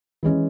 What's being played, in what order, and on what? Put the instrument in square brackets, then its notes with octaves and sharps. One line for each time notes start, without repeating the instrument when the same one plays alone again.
[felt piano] E3 G#3 C#4